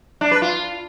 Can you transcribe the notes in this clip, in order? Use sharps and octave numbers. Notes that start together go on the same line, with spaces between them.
D4
B4
F4